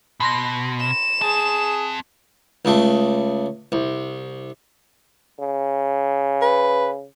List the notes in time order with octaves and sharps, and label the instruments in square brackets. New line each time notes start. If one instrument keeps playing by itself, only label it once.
[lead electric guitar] B2 [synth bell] B5 C6 A#6
[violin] E7
[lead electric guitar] C4 A5 [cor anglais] G#4
[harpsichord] C#2 C#3 A3
C2
[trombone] C#3
[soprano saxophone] B4